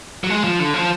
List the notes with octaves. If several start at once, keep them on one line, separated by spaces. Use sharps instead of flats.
F#3
G#3
F3
D3
F3